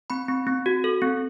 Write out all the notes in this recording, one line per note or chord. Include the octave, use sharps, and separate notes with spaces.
C4 B5
C4
C4
F#4
A4
C4